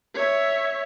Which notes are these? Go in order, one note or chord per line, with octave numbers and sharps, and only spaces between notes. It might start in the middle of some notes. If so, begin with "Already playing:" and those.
C#5 E5